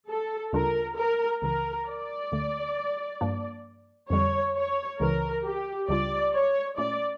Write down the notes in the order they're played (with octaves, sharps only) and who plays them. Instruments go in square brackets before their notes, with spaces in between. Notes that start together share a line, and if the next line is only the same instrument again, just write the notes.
[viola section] A4
[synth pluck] D2 C#3 G3 D4 F4 [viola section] A#4
[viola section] A#4
[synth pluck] C#2 C#3 E3 [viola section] A#4
[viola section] D5
[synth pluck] D2 D3 A3
G2 F3 A#3 D4
[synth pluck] F2 D3 G3 [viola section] C#5
[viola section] C#5
[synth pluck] C#2 C#3 E3 [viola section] A#4
[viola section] G4
[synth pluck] C#2 C#3 G3 D4 F4 [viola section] D5
[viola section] C#5
[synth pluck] A#2 A3 C#4 E4 [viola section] D5